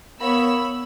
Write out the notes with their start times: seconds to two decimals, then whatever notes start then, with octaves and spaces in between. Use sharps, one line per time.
0.20 B3 A#4 C#5 F5 F#5 B5 E6